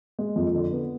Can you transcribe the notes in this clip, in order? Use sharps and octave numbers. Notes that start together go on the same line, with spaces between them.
G#3
F2
D3
B3